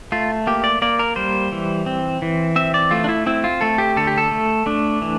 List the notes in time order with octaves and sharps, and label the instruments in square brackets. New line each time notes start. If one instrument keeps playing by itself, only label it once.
[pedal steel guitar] A3 F4
A#3 G4
D5
A#3 D5
A#4
G3 C5
E3
C4
E3
C4 E5
D5
A3 F4
D4
E4
C4 E4
F4
A3 A4
G4
D3 A4
G4
A4
A3
A3 D4
E3